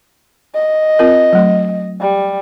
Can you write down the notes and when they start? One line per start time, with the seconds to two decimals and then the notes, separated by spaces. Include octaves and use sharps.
0.55 D#5
0.99 C4 F4 A#4
1.33 F#3 A3
2.00 G3